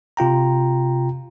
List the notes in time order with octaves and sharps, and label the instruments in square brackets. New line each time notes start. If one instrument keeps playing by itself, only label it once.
[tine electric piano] C3 F4 G5 A#5